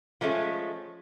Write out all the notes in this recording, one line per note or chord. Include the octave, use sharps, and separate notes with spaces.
F3 G#3 A3 C#4